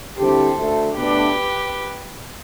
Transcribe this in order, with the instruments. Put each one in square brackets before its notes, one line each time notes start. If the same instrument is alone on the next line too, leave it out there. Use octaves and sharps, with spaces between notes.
[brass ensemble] D3 G3 C4 E4 G4 [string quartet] A4 C5
[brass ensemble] D2 D3 A3
[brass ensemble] B2 A3 D4 [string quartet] G4 B4